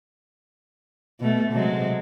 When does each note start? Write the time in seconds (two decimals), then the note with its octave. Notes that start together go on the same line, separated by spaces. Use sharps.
1.20 B2 A3
1.52 C3 F#3 G#3